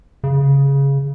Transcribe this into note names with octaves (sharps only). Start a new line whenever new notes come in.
C#3